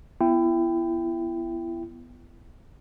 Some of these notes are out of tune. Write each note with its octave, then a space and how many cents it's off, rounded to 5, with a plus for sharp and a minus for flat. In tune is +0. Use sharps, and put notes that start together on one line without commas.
B3 +0 E4 +30 G5 +0